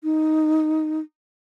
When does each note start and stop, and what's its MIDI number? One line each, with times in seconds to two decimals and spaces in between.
0.04 1.00 63